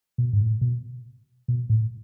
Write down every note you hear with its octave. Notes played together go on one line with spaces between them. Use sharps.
B2
G#2
A2
B2
B2
A2